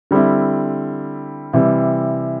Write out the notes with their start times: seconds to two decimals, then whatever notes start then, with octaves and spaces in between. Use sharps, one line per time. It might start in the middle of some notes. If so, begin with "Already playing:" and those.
0.11 D3 G3 C4 E4
1.53 C3 E3 G3